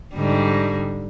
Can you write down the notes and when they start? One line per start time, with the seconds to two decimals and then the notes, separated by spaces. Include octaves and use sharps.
0.14 G#2 D3 G3